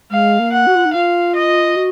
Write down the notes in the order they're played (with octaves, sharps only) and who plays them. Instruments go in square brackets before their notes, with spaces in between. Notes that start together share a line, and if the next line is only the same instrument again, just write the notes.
[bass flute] G#3 [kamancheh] F5
[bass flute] A#3
[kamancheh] F#5
[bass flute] F#4
F4
D#4
[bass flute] F4 [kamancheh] F5
[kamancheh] D#5
[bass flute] F#4